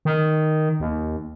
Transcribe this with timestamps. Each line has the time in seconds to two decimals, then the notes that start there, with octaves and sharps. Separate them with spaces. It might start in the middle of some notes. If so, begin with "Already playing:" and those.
0.05 D#3
0.80 D#2